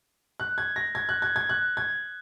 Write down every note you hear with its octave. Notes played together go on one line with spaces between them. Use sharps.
F#6
G#6
A#6
G#6
F#6
G#6
G#6
F#6
G#6